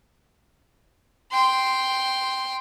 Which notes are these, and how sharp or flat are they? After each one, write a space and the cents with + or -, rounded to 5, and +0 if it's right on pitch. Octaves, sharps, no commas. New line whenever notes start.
G5 +0 C6 +0